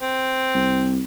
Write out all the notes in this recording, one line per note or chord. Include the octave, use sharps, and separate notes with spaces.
C4
C2